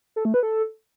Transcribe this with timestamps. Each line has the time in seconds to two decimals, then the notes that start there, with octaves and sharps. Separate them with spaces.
0.16 A4
0.25 A3
0.34 B4
0.43 A4